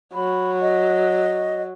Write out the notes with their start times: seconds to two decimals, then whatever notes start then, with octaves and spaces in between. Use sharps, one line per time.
0.14 F#3 B5
0.62 D#5